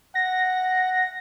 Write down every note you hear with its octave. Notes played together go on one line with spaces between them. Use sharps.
F#5 A#6